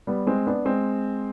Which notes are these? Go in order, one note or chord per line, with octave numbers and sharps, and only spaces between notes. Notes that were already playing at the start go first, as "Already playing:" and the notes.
G3 B3
G#3 C4
B3 D4
G#3 C4